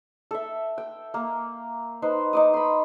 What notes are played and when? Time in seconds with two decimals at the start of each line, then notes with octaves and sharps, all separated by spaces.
0.31 A4 E5
0.78 G5
1.14 A#3
2.02 D#4 B4 C5
2.33 D#4 D6 D#6
2.54 B5 C6